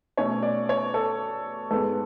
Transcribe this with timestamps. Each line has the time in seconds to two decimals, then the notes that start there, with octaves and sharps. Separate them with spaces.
0.17 B2 A3 C#4 C#5
0.43 D5
0.69 C#5
0.94 A4
1.71 G#2 G#3 B3 A4